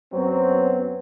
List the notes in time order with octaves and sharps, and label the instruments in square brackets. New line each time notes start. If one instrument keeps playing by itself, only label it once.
[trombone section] F#2 F#3 B3 C4